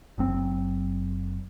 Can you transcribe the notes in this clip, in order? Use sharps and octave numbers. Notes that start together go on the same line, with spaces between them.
F#1 F#3 C4